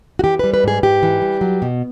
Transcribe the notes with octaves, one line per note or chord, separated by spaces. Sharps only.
F#4
E3 G4
G3 B4
B4
G#2 G#4
G#2 G4
E3
G3
F#3
B2